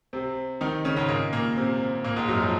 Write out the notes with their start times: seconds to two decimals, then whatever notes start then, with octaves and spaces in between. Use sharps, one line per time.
0.13 C3 C4
0.61 D#3 D#4
0.85 C#3 C#4
0.97 G#2 G#3
1.08 A#2 A#3
1.33 A#2 A#3
1.57 C3 C4
2.04 A#2 A#3
2.16 G#2 G#3
2.28 F#2 F#3
2.40 F3